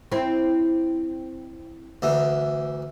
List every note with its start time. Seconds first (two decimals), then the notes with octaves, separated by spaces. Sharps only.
0.12 C4 E4
2.02 D2 E3